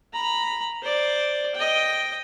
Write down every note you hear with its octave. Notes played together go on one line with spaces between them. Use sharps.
A#5 B5
C5 D5
D#5 G5